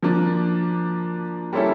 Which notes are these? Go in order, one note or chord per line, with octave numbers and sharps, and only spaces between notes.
F3 A#3 D4
G3 A#3 C#4 E4 A4